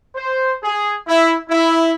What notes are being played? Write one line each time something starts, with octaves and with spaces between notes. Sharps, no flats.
C5
G#4
E4
E4